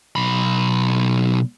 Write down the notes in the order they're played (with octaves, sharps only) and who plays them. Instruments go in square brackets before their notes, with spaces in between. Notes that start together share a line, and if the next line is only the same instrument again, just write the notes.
[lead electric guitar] B1 B5